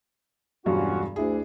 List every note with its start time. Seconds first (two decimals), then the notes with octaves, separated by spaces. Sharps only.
0.66 E1 G2 F#3 C#4 F4 F#4
1.16 D2 D4 E4 G#4